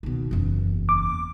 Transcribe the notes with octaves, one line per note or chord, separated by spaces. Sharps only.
B2 D#3
F#1 E2
D6